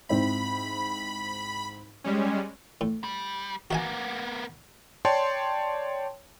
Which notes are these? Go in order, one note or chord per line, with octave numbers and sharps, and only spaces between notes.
G#2 C4 E4 B5
G3 G#3 C#4
A2
G3
A#3 B3 F#4 E5 G#5
C#5 D5 G5 A5 C6